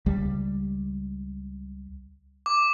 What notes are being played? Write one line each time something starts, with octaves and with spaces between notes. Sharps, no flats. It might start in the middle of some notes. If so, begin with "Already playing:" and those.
C#2 G3
D6